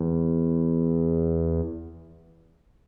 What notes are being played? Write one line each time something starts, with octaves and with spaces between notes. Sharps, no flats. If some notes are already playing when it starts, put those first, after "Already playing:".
Already playing: E2